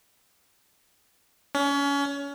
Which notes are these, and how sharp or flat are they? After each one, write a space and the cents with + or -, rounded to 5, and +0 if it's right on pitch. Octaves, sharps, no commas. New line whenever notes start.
C#4 +30